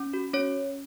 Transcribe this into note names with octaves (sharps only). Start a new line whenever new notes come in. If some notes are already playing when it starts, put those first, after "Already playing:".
Already playing: C#4
F#4
C#4 C#5